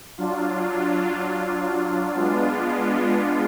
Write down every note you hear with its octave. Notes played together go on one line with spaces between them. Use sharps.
F#3 D4 F4
G#3 B3 D4 F4